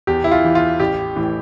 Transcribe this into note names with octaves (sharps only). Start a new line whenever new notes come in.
E2 G4
E4
F4
E3
F4
A1 G4
A2 E3